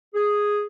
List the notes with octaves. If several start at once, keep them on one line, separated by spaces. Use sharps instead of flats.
G#4